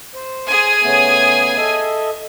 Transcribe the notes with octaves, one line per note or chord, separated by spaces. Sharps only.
C5
G#4 G#5
C#3 A3 B3
A4 D#5 E5